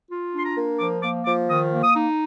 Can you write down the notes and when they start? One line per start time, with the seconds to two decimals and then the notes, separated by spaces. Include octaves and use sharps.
0.11 F4
0.34 D4
0.39 C6
0.46 A#5
0.57 A#3
0.80 F3 D6
1.03 A#3 D6
1.26 F3 D6
1.49 D#3 D#6
1.72 A#3
1.84 D#6
1.95 D#4